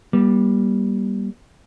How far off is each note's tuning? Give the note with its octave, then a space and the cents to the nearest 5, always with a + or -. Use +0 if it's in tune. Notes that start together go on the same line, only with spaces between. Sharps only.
G3 +0 A#3 +45